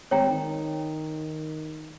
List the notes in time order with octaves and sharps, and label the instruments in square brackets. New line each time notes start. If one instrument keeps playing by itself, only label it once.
[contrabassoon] G#1 [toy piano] C#5 G5 A#5
[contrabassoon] D#3